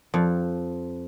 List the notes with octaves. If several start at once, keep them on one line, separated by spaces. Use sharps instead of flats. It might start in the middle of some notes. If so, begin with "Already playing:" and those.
F2